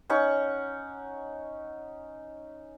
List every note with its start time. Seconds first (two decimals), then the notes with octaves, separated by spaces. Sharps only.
0.10 C#4 D#4 F#5 C#6